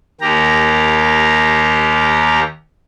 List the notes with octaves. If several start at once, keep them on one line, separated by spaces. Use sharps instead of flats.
D#2 A#3 G4 A#5